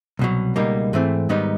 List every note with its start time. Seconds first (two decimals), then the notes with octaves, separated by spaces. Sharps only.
0.19 C2 B2 F#3
0.56 C#2 B2 G3 A#3 D#4
0.93 G#2 E3 A3 C4
1.29 G#2 D#3 G3 B3 D#4